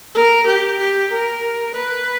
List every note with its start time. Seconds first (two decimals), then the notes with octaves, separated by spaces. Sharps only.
0.15 A#4
0.46 G4
0.78 G4
1.11 A#4
1.74 B4